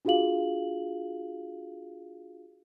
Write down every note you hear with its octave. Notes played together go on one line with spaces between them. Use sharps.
D4 F4 F#4 G#4 F5 F#7